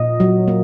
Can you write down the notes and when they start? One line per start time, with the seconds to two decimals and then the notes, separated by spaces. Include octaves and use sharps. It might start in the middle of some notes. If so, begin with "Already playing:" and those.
Already playing: A#2 D#5
0.20 F#3
0.48 A#3